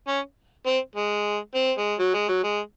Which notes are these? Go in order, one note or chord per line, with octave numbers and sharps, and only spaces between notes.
C#4
C4
G#3
C4
G#3
F#3
G#3
F#3
G#3